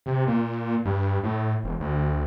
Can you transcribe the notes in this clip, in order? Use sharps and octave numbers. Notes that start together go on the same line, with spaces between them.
C3
A#2
G2
A2
E1
D2